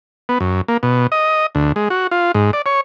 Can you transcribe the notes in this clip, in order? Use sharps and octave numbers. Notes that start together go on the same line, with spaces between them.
B3
F#2
A#3
B2
D#5
D2
G#3
F#4
F4
G#2
D5
C#5